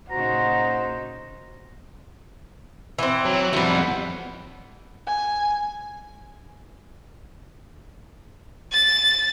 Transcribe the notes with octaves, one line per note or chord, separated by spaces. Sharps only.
A#2 C#3 D#4 F#4 C5 A#5
E3 C4
F#3
F2 E3 G3 B3
G#5
A6